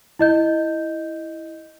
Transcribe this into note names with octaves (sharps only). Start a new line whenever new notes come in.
E4 D#5 G6